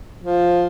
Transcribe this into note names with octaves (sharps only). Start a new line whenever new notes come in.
F3